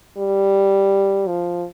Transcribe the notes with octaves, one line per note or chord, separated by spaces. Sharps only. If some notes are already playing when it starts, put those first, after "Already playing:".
G3
F3